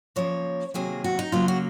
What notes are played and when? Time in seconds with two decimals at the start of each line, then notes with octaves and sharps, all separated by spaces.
0.16 C#3 F3 A#3 C#5
0.74 C3 D#3 F#3 A#3 G#4
1.04 F#4
1.19 D#4
1.32 C#3 F#3 A#3 F4
1.48 F#4